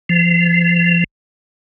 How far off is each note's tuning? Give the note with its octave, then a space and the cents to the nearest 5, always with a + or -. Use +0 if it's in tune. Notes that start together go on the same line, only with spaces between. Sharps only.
F3 -30